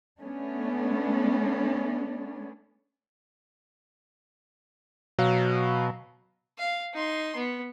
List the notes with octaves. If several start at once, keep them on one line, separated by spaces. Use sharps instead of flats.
A3 B3 C#4 D4
B2 F#3 F5
F5
D#4 C6
B3